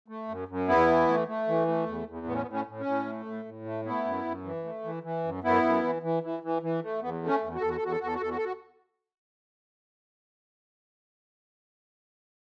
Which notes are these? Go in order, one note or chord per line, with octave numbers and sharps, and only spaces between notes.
A3
F#2
F#2
E2 B3 E4
E3
A3
A3
E3
A3
E2
E2
A2 B3
C#4
B3
A2
C#4
A2
C#4
A2
A3
A2
A2
A3
A3 B3 E4
F#2
F#2
E3
A3
E3
E3
F#2
F#2 B3 E4
F#2
E3
E3
E3
E3
E3
A3
E2 B3
A3
C#4
E2
F#4
E2 A4
F#4
A4
E2 F#4
A4
E2 F#4
A4
F#4
E2 A4
F#4
A4
F#4